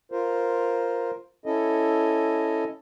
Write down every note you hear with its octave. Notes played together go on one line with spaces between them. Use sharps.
F4 A#4 C5
C#4 E4 A4 D#5